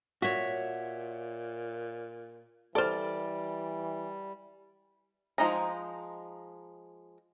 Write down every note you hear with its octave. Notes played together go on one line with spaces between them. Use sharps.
A#2 F#4 C#5 E5
E3 G3 A4 C5 D5 F6
F3 G#3 D#4 D#5 A#5